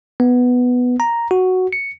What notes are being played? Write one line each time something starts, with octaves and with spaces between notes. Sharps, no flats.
B3
A#5
F#4
C#7